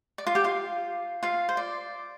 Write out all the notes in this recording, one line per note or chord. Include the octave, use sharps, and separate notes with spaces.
D5
F4 F5
G4 G5
F4 F5
F4 F5
C5
D5